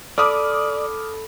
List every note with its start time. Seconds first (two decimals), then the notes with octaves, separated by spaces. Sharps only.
0.18 A4 D5 B5 D6 D#6 F6